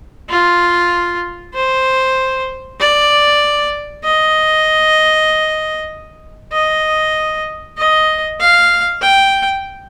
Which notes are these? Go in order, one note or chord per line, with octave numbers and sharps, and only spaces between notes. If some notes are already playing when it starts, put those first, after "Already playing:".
F4
C5
D5
D#5
D#5
D#5
F5
G5